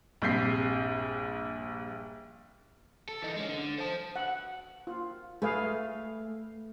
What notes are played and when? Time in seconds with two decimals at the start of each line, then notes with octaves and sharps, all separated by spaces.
0.22 A#1 G2 C3 G6 B6 C7
3.09 A4
3.22 E3 D#4
3.36 G#3 C#4
3.49 D3
3.78 C5 A5
4.16 F#5
4.87 F4
5.42 A3 G#4 B4 F5